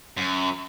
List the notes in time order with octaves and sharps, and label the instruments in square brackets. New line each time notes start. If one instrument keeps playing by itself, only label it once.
[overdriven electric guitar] F#2